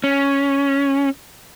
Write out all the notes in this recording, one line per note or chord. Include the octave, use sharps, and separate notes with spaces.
C#4